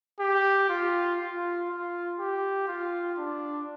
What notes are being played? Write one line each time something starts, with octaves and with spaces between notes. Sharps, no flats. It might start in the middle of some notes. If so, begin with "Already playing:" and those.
G4
F4
F4
F4
G4
F4
D4